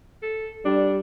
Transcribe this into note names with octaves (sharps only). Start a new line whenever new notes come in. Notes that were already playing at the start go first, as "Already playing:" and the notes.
A4
G3 D4